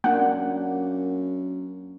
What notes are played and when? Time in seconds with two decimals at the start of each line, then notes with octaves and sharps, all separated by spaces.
0.04 F#2 A#3 D4 F#5